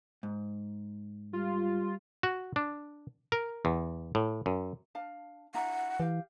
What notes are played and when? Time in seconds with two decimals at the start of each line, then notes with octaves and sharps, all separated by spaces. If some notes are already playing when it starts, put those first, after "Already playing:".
0.23 G#2
1.33 G3 F4
2.23 F#4
2.56 D4
3.32 A#4
3.65 E2
4.15 A2
4.46 F#2
4.95 D4 F5 A5
5.55 D4 E4 F#5 A#5
6.00 E3 G4 F5